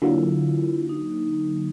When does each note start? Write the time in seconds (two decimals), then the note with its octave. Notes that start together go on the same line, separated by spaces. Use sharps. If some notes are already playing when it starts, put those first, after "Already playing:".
0.02 D3 F#3 A#3 E4 F4
0.89 D#4